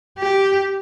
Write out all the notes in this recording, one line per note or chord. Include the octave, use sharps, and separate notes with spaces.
G4